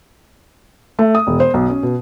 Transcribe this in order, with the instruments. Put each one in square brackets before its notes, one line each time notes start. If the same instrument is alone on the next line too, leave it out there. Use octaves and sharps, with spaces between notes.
[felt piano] A3
D#6
E1
C5
B1
C#4
B2